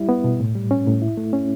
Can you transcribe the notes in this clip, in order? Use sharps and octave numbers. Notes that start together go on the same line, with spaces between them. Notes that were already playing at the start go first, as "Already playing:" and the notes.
Already playing: G3 E4
B3
B2
A2
G3
C#4
A2
E4
A3
C#4